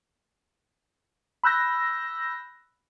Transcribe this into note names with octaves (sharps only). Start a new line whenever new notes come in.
B5 E6 F#6 G6 A#6